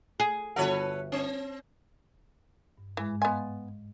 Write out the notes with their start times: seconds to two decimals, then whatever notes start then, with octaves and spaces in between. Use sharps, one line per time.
0.20 G#4
0.56 G1 F#4 A4 B4 C#5 F#5
1.12 C4
2.78 G2
2.97 G#2 E3 G#3
3.22 B3 D#5 F5 G#5 C6